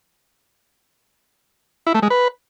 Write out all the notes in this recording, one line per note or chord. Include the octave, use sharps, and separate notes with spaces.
E4
A3
G#3
B4